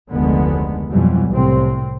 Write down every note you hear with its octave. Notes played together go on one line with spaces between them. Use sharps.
F1 D2 D3 D#3 G#3 B3
F2 B2 E3 F#3 G3
C2 A2 C3 C4